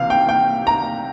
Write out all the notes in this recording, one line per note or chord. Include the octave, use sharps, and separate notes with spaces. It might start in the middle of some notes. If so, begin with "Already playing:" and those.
Already playing: C2 C3 E3 F5
G5
G5
A#5